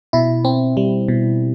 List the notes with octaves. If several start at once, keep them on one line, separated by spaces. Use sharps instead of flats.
B2 E4
C4
G3
B2